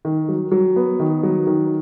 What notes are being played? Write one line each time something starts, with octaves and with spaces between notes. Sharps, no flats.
D#3
F#3
F#3
B3
D#3
F#3
D#3